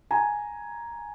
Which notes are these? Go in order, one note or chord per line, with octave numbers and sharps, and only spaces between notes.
G#5 A#5